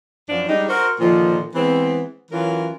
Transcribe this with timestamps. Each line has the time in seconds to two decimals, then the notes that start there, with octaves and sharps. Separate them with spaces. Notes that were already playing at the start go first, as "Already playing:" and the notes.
0.29 F#2 F3 C#4 D4
0.48 G3 G#3 D4 D#4
0.69 F#4 A#4 C5
1.00 A#2 D3 D#3 F3
1.55 E3 G#3 B3 C4
2.31 E3 F#3 C#4 F4 A#4